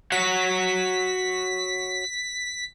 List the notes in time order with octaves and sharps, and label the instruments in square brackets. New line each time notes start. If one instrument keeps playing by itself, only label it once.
[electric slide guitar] F#4 C#5 F#5 [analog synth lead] B6